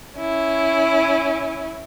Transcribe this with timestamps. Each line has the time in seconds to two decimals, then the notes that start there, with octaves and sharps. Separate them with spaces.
0.18 C#4 E4